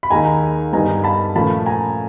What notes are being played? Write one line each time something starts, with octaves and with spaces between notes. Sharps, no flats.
B5
D#2 D#3 G#3 G#5 A#5
G2 D3 G3 B3 D#4 G#5 A#5
A5 B5
A#2 F3 A3 C#4 A5 B5
G#5 A#5